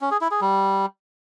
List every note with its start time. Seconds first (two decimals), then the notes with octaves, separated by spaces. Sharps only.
0.01 C#4
0.11 G#4
0.21 E4
0.31 G#4
0.41 G3